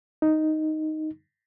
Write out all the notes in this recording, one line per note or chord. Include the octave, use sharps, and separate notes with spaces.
D#4